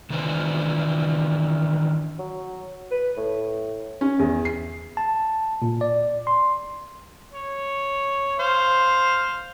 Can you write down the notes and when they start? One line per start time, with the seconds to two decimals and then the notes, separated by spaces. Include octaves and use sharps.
0.10 D#3 E3 D4 B4 C5 G#5
2.19 F#3
2.91 B4
3.17 A2
4.01 C#4
4.19 E2
4.45 C7
4.97 A5
5.62 A#2
5.81 D5
6.27 C6
7.33 C#5
8.39 C5 F5